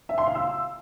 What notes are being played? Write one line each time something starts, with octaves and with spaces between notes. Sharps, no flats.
E5
C6
F5
E6